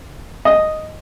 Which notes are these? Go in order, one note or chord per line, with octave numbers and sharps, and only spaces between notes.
D#5